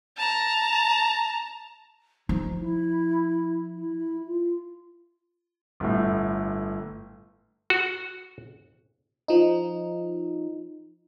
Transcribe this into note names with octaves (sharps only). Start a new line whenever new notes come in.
A5 A#5
F3 D#4
E4
E4
F4
G1 A2
F#4
F3 D#4